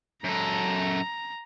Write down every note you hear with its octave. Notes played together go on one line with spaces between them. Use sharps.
F#2 A4 A#5